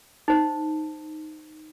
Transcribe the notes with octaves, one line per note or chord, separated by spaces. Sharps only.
D#4 C5